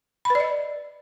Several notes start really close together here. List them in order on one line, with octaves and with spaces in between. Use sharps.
B5 B4 D5 D#5